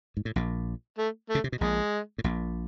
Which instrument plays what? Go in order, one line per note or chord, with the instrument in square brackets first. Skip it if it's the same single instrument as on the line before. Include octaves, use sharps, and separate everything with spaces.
[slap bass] G#2
A2
A#1 A#2
[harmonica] A3
A3
[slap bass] C#3
C3
B2
[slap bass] A#1 A#2 [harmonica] G#3
[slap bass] A2
A#1 A#2